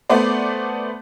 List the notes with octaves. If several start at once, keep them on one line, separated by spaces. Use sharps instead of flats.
A3 B3 C5 D5